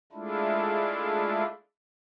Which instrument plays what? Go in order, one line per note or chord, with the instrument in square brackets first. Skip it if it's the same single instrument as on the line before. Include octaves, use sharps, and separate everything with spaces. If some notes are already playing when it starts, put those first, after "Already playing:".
[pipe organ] G#3 A3 D4 E4 F4